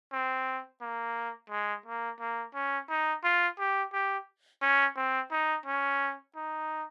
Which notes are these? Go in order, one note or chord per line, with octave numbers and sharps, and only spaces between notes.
C4
A#3
G#3
A#3
A#3
C#4
D#4
F4
G4
G4
C#4
C4
D#4
C#4
D#4